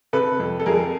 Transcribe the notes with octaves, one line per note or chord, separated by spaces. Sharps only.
C3 A4 B4
F2
A4
F2 G#4 A#4